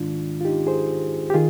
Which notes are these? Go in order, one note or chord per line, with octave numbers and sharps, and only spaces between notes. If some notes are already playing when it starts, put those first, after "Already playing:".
Already playing: G#2 D#3 G#3 D4 F4
F4
D#4 G4
G#4 C5
G4
D#3 F4 G#4